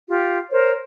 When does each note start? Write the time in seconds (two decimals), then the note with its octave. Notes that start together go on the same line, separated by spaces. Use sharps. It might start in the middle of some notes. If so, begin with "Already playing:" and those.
0.09 F4 G4
0.51 A#4 C5 C#5